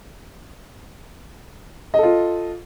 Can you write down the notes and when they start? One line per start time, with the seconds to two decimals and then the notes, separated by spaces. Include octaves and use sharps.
1.94 D#5
1.98 A4
2.03 F4